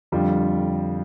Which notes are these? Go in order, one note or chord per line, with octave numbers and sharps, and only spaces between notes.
F2 D3 G3 F4